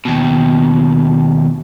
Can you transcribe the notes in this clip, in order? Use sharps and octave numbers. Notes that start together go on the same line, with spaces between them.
D#2 B2